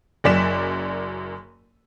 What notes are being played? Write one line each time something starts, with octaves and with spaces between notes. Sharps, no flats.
F#1 F#2 D5 B6 E7